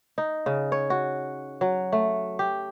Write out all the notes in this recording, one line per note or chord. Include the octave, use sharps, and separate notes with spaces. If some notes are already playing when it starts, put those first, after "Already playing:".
D#4
C#3
C#5
F#4
F#3
A3
G4